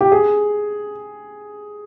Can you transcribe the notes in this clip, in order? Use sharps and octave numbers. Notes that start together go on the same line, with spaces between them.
G4
G#4